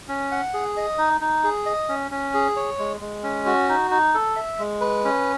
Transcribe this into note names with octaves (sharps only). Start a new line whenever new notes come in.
C#4
F#5
G#4
D#5
D#4
D#4
G#4
D#5
C#4
C#4
G#4
C#5
G#3
G#3
C#4
F#4
D#4
D#4
A4
E5
G#3
B4
C#4